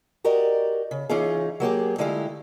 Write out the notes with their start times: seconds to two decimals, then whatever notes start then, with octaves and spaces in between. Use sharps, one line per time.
0.24 F#4 G4 A#4 D5 D#5
0.91 C#3
1.09 E3 C#4 D#4 F4 G#4
1.60 F#3 A#3 G4 G#4
1.98 D3 G#3 A3 E4 F4 G4